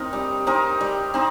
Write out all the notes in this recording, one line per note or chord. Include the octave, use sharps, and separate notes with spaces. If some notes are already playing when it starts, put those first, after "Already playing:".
Already playing: C4 D#4 A#4
G3
C4 D#4 A#4
G3
C4 D#4